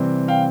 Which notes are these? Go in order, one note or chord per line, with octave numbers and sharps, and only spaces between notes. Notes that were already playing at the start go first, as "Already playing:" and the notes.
Already playing: C3 E3 G3 C4
F5 G5